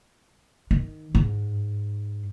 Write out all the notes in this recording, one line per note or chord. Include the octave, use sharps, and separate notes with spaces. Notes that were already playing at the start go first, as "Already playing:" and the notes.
D#3
G#2